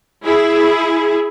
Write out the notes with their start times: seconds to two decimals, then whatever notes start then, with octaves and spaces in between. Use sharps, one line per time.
0.24 E4 G#4